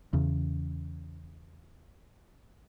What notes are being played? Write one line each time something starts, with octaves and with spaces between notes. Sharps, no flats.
E2 C#3